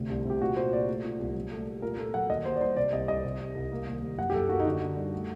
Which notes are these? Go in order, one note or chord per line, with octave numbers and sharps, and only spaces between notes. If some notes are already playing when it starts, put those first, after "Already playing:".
Already playing: D2 C3
C2
C3 G4
A#2 F#4
A#2 C5
A#3 D5
A3
A#2
C2
F#3
A3
A3
A#2 A#4
A#2 A4
F#3 F#5
D#2 D#5
D#2 C5
D5
G3 C5
C3 D5
C2 D#5
C2 D#5
C3
G3
C2
A#3
D#2
D#2
F#2 F#5
G4
F#2 A4
A#3 F#4
D#4
D3 F#4
D3
G3
A3